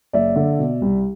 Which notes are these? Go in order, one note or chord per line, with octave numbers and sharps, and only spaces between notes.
F#1 D5 E5
D3
B2
C2